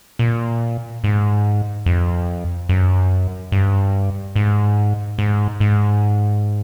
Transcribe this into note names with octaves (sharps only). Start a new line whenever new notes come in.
A#2
G#2
F2
F#2
G2
G#2
G#2
G#2